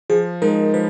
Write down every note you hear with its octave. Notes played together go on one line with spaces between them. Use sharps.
F3 G#4
G#3 D#4 A#4
F3 B4